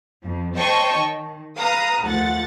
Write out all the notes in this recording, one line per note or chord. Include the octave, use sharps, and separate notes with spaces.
F2
C5 C#5 D#5 G5 A5 C#6
D#3
B4 F5 A#5 D#6
D#2 F3 A3 F#5 A6